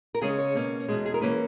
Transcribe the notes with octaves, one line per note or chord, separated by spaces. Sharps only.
A#4
C#3 G#3 C#4 G#4
C#5
B2 A#3 C#4
E2 B2 G#3
G#4
A#4
E3 A#3 C#4 B4